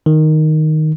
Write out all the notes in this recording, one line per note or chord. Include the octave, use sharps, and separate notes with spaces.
D#3